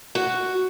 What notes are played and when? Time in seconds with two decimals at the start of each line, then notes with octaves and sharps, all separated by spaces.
0.15 F#4